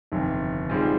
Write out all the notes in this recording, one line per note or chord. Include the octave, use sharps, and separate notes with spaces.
G1 F2 C3 D#3
G#2 G3 C4 F4 G#4